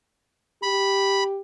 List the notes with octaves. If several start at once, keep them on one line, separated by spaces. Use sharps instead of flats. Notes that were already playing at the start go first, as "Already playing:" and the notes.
G4 B5